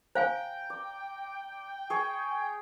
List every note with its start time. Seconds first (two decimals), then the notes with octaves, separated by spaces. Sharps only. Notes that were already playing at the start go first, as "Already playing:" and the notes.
0.15 C5 F5 G5 G#5 A#5
0.70 D5
1.90 G#4 C#5